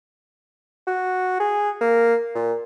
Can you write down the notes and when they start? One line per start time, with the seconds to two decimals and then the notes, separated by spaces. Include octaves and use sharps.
0.87 F#4
1.40 G#4
1.81 A#3
2.35 A#2